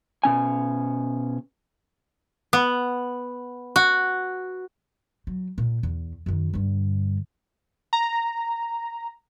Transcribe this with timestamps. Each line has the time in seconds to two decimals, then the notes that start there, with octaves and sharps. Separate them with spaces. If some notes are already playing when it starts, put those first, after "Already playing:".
0.24 B2 C#4 G#5
2.53 B3
3.76 F#4
5.27 F#3
5.58 A#2
5.83 E2
6.26 F#2 D#3
6.53 G2 D3
7.93 A#5